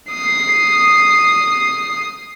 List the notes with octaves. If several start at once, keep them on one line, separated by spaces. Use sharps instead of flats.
D#6 C7